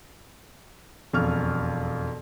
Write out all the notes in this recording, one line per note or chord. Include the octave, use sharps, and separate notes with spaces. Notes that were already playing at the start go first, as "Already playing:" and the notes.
E1 F2 C#6 F6